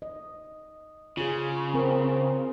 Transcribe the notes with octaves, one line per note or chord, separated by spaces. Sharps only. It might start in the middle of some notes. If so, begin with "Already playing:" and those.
D#5
C#3 F4 G#4
C4 A#4